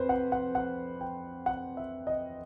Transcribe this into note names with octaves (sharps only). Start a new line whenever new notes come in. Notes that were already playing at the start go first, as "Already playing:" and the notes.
Already playing: F2 B4 C5
F#5
F#5
F#5
G5
F#5
E5
D#5